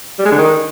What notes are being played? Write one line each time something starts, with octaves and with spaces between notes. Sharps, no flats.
G3
G#3
D3
D#3